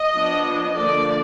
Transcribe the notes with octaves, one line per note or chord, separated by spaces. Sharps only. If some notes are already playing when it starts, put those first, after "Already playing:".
Already playing: D#5
F3 B3 D4
D3 F3 A#3 D4 D5